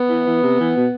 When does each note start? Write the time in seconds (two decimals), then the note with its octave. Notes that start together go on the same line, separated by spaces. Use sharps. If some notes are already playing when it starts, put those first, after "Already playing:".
Already playing: B3
0.09 E3
0.26 E3
0.43 C3
0.59 E3
0.75 B2